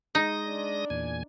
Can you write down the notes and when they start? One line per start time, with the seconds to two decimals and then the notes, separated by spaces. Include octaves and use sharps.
0.15 G#3 D#4 D#6 A#6
0.46 D4
0.90 E2 A#2 G#5